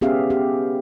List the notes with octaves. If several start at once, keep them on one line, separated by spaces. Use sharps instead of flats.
B3 C#4 G4 G#4 E5 F5
G4